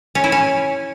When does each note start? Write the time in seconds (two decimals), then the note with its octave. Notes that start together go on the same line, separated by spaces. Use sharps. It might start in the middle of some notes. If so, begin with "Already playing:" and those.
0.15 C#4
0.24 E4
0.32 C#4